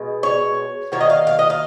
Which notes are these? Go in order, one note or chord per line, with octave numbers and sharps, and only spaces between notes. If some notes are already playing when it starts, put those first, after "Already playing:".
Already playing: B2 G#3
C#5
D#3 F#3 A#3 C#5
D#5
F5
F5
D#5
F5